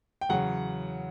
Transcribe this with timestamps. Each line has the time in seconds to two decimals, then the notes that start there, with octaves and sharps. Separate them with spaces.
0.21 G5
0.29 E2 C#3 F#3 F#5